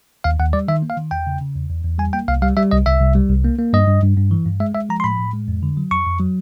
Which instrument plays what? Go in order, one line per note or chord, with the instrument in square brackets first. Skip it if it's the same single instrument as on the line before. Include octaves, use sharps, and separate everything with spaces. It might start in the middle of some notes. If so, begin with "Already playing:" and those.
[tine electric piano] D#2 F5
D#2 F#5
G3 D5
D#3 E5
A#3
F5
D#3
E2 G5
C#3
C#3
E2
E2
E2
G3 G#5
A#3 G5
C2 F5
G3 F5
G3 E5
C2 D#5
C2 E5
C2
G3
C2
A#3
A#3
G2 D#5
G2
G2
G2
E3
G2
G#3 E5
G#3 E5
F3 A#5
C6
A2 B5
A2
G#3
F2
D3
F#3
F2 C#6
F2
F#3